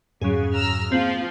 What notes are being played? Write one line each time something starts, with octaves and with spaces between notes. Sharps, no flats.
F2 G#2 C#3 F#3 G#4
A#5 E6 F6
F3 A#3 C4 F4 F#7